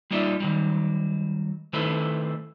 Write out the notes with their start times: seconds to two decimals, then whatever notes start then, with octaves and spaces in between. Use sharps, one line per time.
0.11 G3 A#3 D#4 F4 D5 E5
0.40 D#3 F#3 G3
1.73 D#3 A3 E4 A4 B4 C5